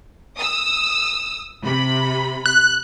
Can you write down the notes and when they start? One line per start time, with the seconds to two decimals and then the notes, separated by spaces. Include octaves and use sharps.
0.38 D#6 E6
1.64 C3 B5
2.46 F#6